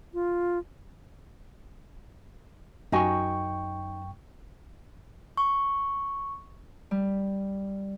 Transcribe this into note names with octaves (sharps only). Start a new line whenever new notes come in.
F4
F#2 D#4 F#4 G5 G#5 C#6
C#6
G3